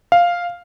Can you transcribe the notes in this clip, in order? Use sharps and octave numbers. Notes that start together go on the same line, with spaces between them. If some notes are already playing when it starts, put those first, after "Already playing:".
F5